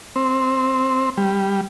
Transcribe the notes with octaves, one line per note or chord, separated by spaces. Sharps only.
C4
G3